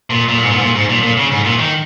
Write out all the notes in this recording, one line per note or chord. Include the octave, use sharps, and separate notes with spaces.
A#2
A#2
G#2
A#2
G#2
A#2
G#2
A#2
A#2
C#3
G#2
A#2
D#3